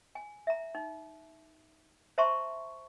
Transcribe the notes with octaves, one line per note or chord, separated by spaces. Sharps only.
G#5
E5 A#5
D#4
C5 E5 A5 A#5 C6 C#6